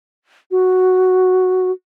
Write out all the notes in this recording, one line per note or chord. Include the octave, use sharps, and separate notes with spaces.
F#4